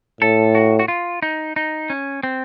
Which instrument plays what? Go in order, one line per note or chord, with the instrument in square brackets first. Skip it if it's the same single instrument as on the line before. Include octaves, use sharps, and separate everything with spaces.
[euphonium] A2 [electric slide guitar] A4
[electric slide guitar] F#4
F#4
F4
D#4
D#4
C#4
C4